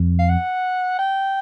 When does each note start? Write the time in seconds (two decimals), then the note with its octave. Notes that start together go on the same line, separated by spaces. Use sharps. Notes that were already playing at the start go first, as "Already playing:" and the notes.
Already playing: F2
0.19 F5
0.29 F#5
0.99 G5